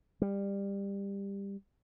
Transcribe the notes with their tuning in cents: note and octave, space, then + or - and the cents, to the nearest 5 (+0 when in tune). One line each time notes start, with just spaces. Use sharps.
G3 +20